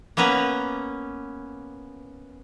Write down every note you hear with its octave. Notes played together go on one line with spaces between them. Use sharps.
A#3 B3 C#4 B4 A#5